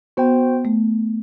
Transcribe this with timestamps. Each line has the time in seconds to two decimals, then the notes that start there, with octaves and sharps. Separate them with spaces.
0.17 B3 F#4 C5 G5
0.65 A3